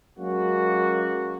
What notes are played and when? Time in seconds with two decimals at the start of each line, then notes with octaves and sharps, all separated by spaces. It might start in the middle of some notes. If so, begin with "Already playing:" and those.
0.18 F#3 G#3 A#3 C#4 F#4